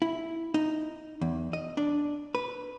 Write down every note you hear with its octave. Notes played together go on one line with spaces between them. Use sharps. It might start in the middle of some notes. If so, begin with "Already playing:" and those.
E4
D#4
E2
D#5
D4
B4